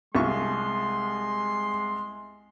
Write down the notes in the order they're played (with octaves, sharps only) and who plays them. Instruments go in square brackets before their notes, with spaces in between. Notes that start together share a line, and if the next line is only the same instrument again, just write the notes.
[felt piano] C2 [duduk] G#3 [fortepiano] F4 E5 C#6 [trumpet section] C6